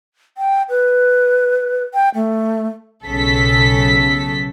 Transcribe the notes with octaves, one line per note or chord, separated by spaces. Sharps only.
G5
B4
G5
A3
B1 C#3 A4 B6